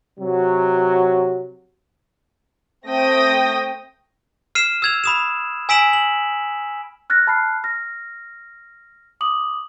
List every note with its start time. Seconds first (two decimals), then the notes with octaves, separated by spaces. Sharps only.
0.19 C3 F#3
2.86 A3 C4 G5 D#6 A#6
4.55 F6 C7 D#7 E7
4.82 E6 G#6 F7
5.04 B5 D#6 E7
5.69 G#5 E6 B6 D7 E7 F#7
5.93 F#7
7.10 F6 F#6 A6 A#6
7.27 A5 B5 F6 F#6 C7
7.64 F6 A#6
9.21 D6 D#6 F#7